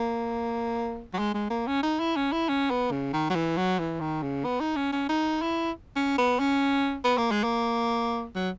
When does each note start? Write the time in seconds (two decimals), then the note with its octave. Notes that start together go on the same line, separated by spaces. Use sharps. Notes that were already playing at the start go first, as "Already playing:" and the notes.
Already playing: A#3
1.14 F#3
1.19 G#3
1.34 G#3
1.50 A#3
1.67 C#4
1.83 D#4
2.00 E4
2.16 C#4
2.32 E4
2.49 C#4
2.70 B3
2.91 C#3
3.13 D#3
3.30 F#3
3.35 E3
3.57 F#3
3.79 E3
4.01 D#3
4.22 C#3
4.44 B3
4.60 D#4
4.76 C#4
4.92 C#4
5.09 D#4
5.42 E4
5.96 C#4
6.18 B3
6.40 C#4
7.04 B3
7.18 A#3
7.31 G#3
7.43 A#3
8.35 F#3